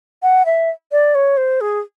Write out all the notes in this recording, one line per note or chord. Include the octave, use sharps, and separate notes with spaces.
F#5
E5
D5
C#5
C5
G#4